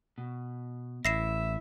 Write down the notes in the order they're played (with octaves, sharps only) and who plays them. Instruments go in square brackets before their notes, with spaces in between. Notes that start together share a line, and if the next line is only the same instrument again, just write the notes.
[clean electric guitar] B2
[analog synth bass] A1 [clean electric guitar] E4 [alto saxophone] E5 [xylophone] A#6 C7 E7